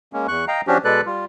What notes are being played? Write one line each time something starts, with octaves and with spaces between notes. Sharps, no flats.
G#3 A#3 C#4
E2 C#6 F#6
D#5 F5 G5 A#5
F3 C#4 D4 F#4 G4
B2 G#3 A4 B4 D5 F#6
G3 F4